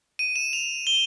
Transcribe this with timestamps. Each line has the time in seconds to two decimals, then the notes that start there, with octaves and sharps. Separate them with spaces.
0.19 D#7
0.36 E7
0.53 F7
0.87 G7